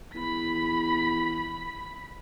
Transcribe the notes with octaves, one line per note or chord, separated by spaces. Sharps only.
E2 B5 B6